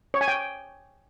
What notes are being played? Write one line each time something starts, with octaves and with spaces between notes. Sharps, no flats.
C#5
G#5
G5